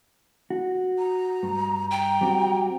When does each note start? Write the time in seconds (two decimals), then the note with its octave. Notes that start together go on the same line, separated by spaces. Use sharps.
0.50 F#4
0.99 A#5
1.43 G2
1.91 G5 A#5
2.21 G3 C4 F#4